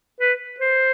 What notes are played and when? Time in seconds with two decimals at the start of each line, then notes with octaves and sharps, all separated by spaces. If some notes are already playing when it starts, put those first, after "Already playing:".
0.21 B4
0.60 C5